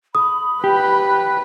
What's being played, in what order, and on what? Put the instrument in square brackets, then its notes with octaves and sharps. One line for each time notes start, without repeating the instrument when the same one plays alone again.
[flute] B5 [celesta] D#6
[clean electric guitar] G4 [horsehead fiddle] B4